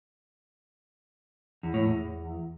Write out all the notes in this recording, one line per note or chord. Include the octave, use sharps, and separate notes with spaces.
E2
A2
E2